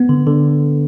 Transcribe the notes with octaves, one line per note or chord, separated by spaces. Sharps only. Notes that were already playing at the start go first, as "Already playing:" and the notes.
Already playing: B3
D3
D3